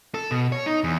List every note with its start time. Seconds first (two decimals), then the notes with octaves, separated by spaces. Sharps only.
0.14 A4
0.31 B2
0.52 C#5
0.66 D#4
0.84 E2